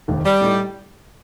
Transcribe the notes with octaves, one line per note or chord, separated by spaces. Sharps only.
F1 D#2 D#3
G3
A2 A3 D#4